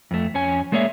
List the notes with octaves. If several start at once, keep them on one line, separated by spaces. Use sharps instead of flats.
F2 A3
F2 C#4 G#5
G#3 A#3 G#4 C#5 D5 E5